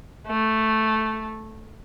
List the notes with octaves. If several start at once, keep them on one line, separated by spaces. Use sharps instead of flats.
A3